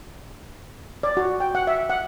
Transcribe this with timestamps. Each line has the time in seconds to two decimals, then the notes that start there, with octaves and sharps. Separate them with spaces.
1.03 D5
1.17 F#4
1.40 G5
1.55 F#5
1.67 E5
1.90 F#5